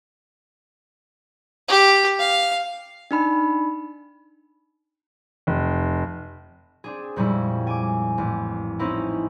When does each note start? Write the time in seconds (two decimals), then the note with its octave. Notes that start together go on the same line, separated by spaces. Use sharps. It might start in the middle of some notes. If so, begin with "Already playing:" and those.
1.68 G4
2.19 F5
3.11 D4 D#4 B5
5.47 F1
6.84 C4 D4 G#4
7.16 F2 A#2 G3 G#3 C#4 E4
7.67 G#5 D6
8.18 A1
8.79 C4 C#4 D#4 E4